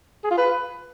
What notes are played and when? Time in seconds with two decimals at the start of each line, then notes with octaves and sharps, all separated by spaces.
0.24 G#4
0.31 F4
0.38 B4